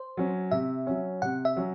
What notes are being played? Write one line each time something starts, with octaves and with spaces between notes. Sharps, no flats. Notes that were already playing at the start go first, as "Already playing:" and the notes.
Already playing: C5
F#3 C#4
C3 E5
F#3 C#4
C3 F#5
E5
F#3 C#4